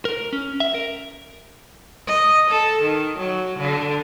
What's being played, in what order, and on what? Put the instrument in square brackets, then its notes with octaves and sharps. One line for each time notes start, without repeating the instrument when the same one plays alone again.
[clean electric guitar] A#4
C#4
E5
A#4
[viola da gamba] D#5
A4
D#3
F#3
D3